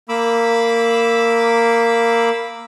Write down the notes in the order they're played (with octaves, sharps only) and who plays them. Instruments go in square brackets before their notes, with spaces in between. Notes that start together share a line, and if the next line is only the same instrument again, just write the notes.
[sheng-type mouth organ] A#3 B5 D6 E6